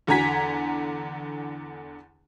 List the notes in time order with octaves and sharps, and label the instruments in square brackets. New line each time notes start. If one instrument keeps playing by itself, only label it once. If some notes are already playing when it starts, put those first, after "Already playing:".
[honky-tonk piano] E2 D3 G#5 A#5 G#6 B6